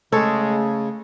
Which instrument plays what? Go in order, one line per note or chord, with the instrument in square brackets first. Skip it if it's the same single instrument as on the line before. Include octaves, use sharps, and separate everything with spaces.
[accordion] C#3 [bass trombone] G#3 [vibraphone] A3 [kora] A4 C#5